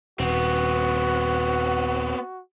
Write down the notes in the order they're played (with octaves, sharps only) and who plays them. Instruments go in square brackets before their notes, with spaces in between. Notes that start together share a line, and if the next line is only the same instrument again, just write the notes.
[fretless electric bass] D#1 [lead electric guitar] B3 C4 [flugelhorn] F#4